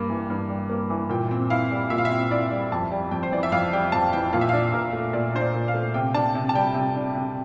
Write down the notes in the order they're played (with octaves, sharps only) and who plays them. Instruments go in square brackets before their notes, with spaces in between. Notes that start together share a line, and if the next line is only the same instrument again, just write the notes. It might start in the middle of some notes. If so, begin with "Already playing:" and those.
Already playing: [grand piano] G2 G3 A#3
E3
G2
G3
A#3
E3
A#2 G5
C4
E4 F5
G3
A#2 E5
F5
E5
C4
E4 D5
G3
F2 A5
G3
F2 G5
C5
E3 D5
E5
F2 F5
G3 G5
F2 A5
E3 G5
A#2 F5
E5
D4 F5
A#2 A#4
A3
A#2 D5
D4 C5
D5
A#2
F5
A3
C3 G5
D4 A5
C3
A5
G3 G5
C3
D4
C3